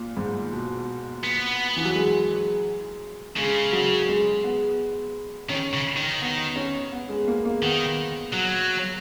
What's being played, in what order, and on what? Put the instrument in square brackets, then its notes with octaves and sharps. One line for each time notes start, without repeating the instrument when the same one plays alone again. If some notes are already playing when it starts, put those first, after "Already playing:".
Already playing: [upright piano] A#2
G#2
B2
[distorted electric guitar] B3
[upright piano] E3
F#3
G#3
[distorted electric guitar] C#3 [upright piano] G#3
[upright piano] F#3
G#3
B3
[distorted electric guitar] D#3 [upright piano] C#4
[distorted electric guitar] C#3
D#3
[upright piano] B3
C#4
B3
G#3
A#3
A#3
[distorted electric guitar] D#3 [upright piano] B3
[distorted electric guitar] F#3